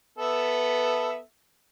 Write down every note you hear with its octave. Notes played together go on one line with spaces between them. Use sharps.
B3 A4 E5